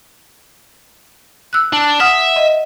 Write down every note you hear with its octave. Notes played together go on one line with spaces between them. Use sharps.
E6 F#6
D4
E5 F#5 D#6 F6
D#5